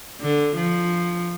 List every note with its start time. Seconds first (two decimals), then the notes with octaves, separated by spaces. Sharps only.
0.21 D3
0.57 F3